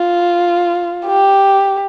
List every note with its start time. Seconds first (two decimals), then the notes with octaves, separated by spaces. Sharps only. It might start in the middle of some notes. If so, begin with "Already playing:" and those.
Already playing: F4
1.07 G4